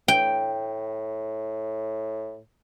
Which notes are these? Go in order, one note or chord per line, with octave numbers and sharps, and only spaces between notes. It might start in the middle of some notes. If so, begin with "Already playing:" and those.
A2 G5